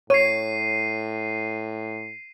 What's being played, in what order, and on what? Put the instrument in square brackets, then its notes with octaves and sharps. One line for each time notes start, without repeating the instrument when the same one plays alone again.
[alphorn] A2 [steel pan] C#5 [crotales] C7 D#7